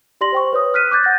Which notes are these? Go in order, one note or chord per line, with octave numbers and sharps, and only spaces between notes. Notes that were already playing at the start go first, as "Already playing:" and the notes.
G4 D5 C6 A#6 F#7
C5 G5 C#6
B4 C#5 D#6
F6 F#6 B6 D#7
D6 F#6 G6 A6
F#5 G6 A6 A#6